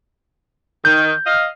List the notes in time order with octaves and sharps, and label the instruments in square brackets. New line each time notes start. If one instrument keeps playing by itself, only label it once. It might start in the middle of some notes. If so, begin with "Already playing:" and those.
[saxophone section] D#3 [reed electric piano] G6
[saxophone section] D#5 F5